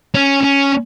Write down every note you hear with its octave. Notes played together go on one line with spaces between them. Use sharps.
C#4
C#4